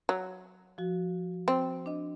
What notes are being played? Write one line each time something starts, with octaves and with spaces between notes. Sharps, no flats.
F#3
F3 F#4
C4
D4 D#5